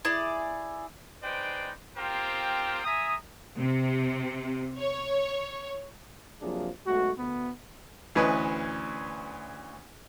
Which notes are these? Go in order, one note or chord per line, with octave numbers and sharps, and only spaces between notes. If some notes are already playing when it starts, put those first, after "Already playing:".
E4 G#4 D5
G#3 D#4 B4 C5 D5 G5
C4 F4 G4 A#4 C5 G5
E5 G#5 A#5 D#6
C3
C#5
C3 F3 F#3 A#3 D4 G#4
B1 G#3 A3 F#4
D2 B3
D2 E3 C#4 B4 D#5 G#5